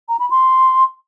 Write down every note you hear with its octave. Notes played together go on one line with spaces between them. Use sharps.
A#5
B5
C6